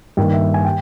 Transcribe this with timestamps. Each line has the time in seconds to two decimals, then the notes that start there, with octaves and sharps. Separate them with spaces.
0.17 G2 D#3 A#3 G5
0.34 E5
0.54 G#5
0.65 G5